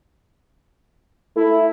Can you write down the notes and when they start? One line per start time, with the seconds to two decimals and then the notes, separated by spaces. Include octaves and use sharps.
1.36 A3 E4